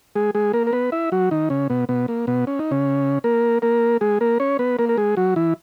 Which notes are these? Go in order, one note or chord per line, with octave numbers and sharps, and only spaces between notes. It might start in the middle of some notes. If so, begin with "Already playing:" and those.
G#3 G#4
G#3 G#4
A#3 A#4
A#4
B3 B4
E4 E5
F#3 F#4
D#3 D#4
C#3 C#4
B2 B3
B2 B3
A#3
B2 B3
C#4
D#4
C#3 C#4
A#3 A#4
A#3 A#4
G#3 G#4
A#3 A#4
C#4 C#5
B3 B4
A#3 A#4
A#4
G#3 G#4
F#3 F#4
E3 E4